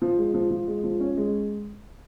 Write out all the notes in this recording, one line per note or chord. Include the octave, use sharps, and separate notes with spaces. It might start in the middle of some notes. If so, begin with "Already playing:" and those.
F3
G#3
F3
F3
G#3
F3
C#4
G#3